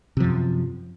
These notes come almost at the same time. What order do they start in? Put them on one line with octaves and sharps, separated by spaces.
C3 F3 F#2